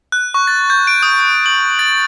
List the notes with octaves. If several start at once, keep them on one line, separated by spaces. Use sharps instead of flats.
F#6
C#6
A6
G6
D7
D#6
F#7
A6